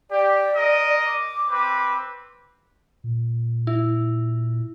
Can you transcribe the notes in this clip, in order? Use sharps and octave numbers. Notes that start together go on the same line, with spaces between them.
G4 D5
A#4 D#5
D6
C4 B4
A#2
E4